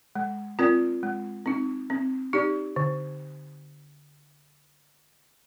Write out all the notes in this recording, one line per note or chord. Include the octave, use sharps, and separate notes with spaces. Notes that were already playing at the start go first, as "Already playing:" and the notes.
G#3
C4 F4 A#4 D5
G#3
C4 D#4
C4
D#4 G4 D5
D3